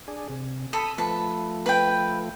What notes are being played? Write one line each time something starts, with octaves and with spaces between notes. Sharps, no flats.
D4 G#4
C3
A4 B5 D#6
F3 A3 B4 A5
B4 G5